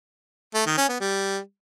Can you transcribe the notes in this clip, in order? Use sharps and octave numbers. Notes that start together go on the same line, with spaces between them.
A3
D#3
C#4
B3
G3